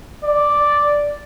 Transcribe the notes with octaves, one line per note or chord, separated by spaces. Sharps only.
D5